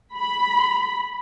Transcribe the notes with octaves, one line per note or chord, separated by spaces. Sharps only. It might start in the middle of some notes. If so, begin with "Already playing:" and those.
B5